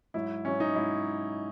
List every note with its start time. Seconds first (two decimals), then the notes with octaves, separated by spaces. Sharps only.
0.14 G#2 F#3 E4
0.45 G#2 F#3 C#4
0.60 D#4
0.75 G#2 F#3 E4